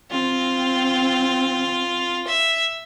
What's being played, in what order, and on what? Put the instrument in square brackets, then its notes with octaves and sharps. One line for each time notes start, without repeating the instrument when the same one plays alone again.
[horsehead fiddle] C4 [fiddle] F4
[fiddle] E5